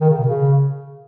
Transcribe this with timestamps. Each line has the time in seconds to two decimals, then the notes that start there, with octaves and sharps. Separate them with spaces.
0.01 D#3
0.09 C#3
0.19 B2
0.27 C#3